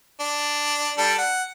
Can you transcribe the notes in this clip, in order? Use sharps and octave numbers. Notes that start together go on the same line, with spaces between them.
D4
G3 D4 A4
F#5